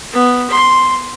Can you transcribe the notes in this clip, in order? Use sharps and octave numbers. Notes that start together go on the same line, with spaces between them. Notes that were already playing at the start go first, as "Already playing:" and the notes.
B3
C6